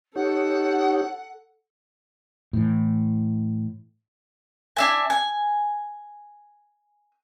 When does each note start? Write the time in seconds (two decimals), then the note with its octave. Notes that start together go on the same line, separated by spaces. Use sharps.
0.16 D#4 G4 A4 C#5 F#5
2.53 A2 E3
4.77 D4 E4 G#5
5.10 G#5